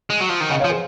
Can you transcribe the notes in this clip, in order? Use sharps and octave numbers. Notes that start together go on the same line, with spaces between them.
G#3
F#3
F3
D#3
C#3 D#5 F#5
C#5 F5
F3
G#4 C5